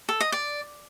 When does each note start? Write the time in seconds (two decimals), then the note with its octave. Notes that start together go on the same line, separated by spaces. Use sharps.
0.09 A4
0.21 D#5
0.32 D5